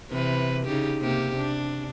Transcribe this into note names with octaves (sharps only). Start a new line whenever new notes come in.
C3 E3 B4
C#3 D#4 G4
C3 A#3 G4
D4